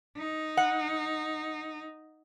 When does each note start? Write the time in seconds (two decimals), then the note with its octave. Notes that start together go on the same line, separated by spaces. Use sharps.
0.17 D#4
0.57 F#5